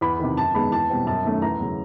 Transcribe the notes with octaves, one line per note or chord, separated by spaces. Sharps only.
E2 B5
C3 D#3
F#2 A5
D#3 G#3 B3 B5
E2 A5
B2 G3 C4
F#2 A5
D#3 F#3 A3 C#4
E2 A#5
C#3 F#3